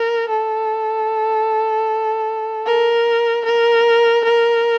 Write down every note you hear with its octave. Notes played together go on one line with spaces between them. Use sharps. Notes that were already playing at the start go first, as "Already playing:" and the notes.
Already playing: A#4
A4
A#4
A#4
A#4